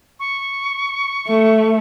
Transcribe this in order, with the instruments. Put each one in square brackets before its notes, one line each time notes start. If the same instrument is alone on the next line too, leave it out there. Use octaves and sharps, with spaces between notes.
[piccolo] C#6
[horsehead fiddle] A3